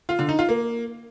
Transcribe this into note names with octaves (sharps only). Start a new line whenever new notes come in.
F4
D3
D#4
F4
A#3